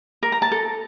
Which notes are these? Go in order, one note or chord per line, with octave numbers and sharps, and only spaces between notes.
A#4
A#5
A5
A4